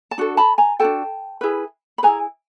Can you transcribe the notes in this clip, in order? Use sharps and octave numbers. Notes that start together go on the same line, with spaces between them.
A5
D4 F#4 A4
A5 B5
G#5 A#5
D4 F#4 A4 G5 A5
E4 G#4 B4
B5
E4 G#4 B4 G#5 A#5